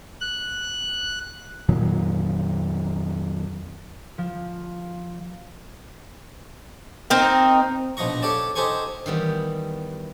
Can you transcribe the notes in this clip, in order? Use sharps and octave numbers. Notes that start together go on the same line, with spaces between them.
F#6
F2 A#2 D#3 F#3
F3
C4 D#4 A#4
A#1 B2 F3 D#4 A#5 C#6
G4 A4 C#5 D5 G5 A5
D#4 G4 A4 C5 G#5 C#6
D#3 E3 G3 B3